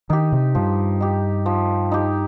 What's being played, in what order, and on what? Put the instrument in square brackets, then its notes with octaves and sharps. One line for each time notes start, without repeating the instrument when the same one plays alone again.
[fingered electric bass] D#3 [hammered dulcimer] D#4 G4
[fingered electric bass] C3
[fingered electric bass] G2 [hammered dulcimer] F3
[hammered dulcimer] D#4 G4
F3
D#4 G4